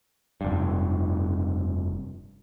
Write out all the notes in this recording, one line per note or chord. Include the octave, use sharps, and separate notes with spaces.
F1 G2